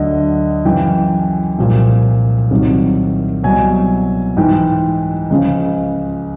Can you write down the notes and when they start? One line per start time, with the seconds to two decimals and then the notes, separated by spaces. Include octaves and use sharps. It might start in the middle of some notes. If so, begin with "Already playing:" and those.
Already playing: D2 D3 F#3 D#5
0.65 F#2 C#3 E3 G5
1.58 C2 A#2 F3
2.51 C2 C3 D#3 F#3
3.43 C2 B2 F#3 G#5
4.37 G#2 E3 G5
5.30 C#2 C#3 F3